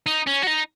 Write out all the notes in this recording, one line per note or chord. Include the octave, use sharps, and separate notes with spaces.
D#4
C#4
F#4
D#4